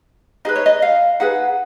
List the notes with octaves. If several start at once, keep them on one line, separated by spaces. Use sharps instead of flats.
D#4 G#4 B4 D#5
C#5
D#5
F5
D#4 G#4 B4 F#5